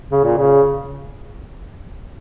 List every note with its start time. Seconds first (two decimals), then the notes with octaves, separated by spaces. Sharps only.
0.11 C#3
0.24 A#2
0.37 C#3